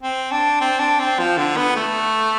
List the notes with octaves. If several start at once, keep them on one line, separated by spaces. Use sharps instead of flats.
C4
D4
C4
D4
C4
F3
D3
B3
A3